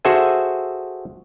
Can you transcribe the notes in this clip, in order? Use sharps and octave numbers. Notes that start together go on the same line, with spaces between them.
F#4 G#4 A4 C5 E5 G#5